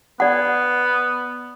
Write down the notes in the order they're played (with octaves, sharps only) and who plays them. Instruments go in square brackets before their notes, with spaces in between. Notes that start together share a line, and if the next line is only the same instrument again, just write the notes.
[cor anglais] B3 [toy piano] D5 F#5